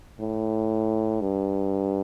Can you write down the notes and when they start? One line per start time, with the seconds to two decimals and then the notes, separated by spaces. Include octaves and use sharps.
0.20 A2
1.21 G2